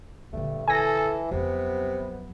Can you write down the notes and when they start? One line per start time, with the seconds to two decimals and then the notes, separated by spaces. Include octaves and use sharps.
0.33 A#1 G2 D3 A3
0.68 E3 A4 G#5 A#6
1.31 F2 C3 F#3 B3